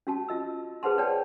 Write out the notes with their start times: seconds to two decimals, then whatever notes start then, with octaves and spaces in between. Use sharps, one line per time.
0.07 C#4 F#4 A5
0.29 F4 D#5 E6
0.83 G#4 B4 C5 F#5 A5 C6
0.98 B4 C#5 D5 G5 A5